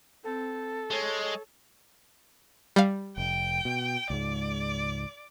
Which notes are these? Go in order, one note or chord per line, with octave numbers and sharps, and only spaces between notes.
C4 A4
G#3 C#5
G3 F5
F1 G5
B2
C#2 G#2 D5